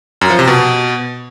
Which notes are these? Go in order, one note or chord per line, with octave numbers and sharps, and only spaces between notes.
F#2
F3
C3
B2